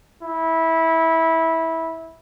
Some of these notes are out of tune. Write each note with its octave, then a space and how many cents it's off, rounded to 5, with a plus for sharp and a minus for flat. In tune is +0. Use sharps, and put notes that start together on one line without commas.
E4 -15